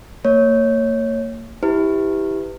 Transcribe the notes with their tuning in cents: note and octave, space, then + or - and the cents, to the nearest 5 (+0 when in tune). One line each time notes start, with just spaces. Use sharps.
A#3 -35 C#5 +0
E4 -20 G4 +0 B4 +20